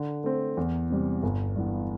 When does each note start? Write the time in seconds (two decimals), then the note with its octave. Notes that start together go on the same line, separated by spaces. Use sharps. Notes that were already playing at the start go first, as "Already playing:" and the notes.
Already playing: D3
0.24 A3 C4
0.57 E2
0.90 C3 G3
1.23 G1
1.56 G2 E3 B3